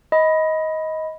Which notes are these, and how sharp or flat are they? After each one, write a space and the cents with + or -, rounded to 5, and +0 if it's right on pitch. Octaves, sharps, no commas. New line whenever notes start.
D#5 +20 B5 +0